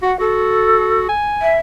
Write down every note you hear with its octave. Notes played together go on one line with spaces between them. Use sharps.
F#4 F#5
F#4 A4
G#5
E5